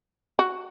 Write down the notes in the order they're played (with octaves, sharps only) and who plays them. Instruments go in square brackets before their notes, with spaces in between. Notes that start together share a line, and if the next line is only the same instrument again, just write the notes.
[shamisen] F#4